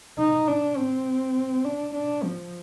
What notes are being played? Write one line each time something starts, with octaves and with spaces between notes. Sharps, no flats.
D#4
D4
C4
D4
D4
F3